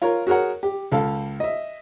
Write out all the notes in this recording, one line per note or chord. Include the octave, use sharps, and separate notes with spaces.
F4 A#4 C#5
F#4 G#4 A#4 C#5 F#5
G4
C#2 A4 F5
D#5 E5